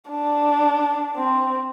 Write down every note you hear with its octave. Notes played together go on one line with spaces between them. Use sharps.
D4
C4